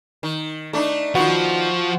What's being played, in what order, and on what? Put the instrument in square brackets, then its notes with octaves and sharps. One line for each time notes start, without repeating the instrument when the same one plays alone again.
[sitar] D#3
[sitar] A3 D4 D#4 [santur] D6
[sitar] D#3 B3 [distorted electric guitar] F3 [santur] F#4